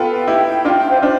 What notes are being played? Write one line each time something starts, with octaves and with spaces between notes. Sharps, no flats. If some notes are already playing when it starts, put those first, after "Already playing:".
Already playing: B3 F4 A4 B4 G5
E4 G4
D4 F4
G5
C5
D4 F4 C5